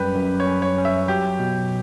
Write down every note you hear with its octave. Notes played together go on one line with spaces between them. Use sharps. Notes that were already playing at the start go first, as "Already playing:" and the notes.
Already playing: F#2 G3 C#4 G4 B4
F#2
C#5
C#4
C#5
C#4
E5
F#3 G4
B2